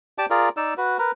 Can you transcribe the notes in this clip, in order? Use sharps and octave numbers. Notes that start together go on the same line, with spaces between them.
G4 D5 A5 D6
F4 G#4 A#4 D5
D#4 D5 E6
F#4 B4
A#4 B4